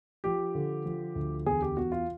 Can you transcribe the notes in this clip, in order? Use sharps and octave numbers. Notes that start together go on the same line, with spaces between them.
F3 G4
D3
F3
D2
E2 G#4
G4
E2 F#4
F4